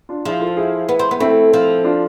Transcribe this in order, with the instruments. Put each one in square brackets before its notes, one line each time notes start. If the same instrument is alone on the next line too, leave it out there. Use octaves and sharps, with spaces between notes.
[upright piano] D4 F4
[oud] F3 [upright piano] E4 G#4
[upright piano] F4 A4
E4 G#4
[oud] B3
C4
B3
[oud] A3 [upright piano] C4 E4
[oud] F3
[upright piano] D4 F4